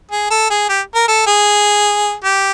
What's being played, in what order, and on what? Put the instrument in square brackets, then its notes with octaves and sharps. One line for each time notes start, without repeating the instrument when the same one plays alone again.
[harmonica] G#4
A4
G#4
G4
A#4
A4
G#4
G4